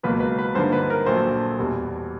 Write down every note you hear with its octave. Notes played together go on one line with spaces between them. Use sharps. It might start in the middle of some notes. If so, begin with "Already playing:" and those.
C#2 B2 F#3 A#3 B4
B4
B4
G2 D3 F3 A#3 D#4 C5
B4
A#4
A#1 A#2 F#3 A3 C5
E2 B2 G3